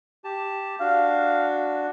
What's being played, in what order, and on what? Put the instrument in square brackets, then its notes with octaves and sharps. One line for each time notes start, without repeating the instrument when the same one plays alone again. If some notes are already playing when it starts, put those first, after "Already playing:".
[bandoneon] G4 A5
[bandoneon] D4 F#4 [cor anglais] F5